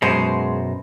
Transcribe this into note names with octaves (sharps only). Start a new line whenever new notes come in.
F#2 B2 G#3 C5